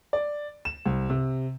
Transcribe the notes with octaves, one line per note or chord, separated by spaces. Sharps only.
D5
E7
C2
C3